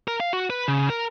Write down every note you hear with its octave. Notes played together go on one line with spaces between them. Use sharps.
A#4
F5
F#4
B4
C#3
A#4